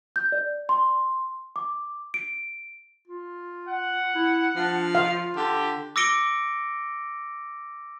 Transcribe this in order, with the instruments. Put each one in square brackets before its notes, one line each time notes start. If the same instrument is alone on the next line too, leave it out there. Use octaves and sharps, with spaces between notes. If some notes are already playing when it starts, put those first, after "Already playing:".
[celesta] G6
D5
C6
D6
D7
[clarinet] F4
[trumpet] F#5
[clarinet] E4
[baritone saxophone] F3 [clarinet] D4
[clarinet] F4 [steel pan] F5
[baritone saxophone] D3 [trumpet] G4
[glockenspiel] D6 E6 A#6 C#7 D7 G7